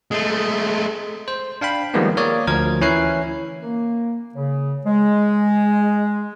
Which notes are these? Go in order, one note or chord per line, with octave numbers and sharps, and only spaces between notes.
G#3 A3
C5
D4 F5 G5 B5
D#3 F3 G3 G#3 A#3 B3
A#3 A#4 C#5 D5 D#6
D2 F3 A#4 G#6
E3 C#4 E4 C#5 F#6 C7
A#3
C#3
G#3